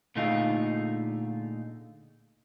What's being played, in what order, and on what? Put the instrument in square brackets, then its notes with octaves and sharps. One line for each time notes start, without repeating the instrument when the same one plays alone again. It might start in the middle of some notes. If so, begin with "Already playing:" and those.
[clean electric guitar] A#2 D3 A3 D#4 F4 G#4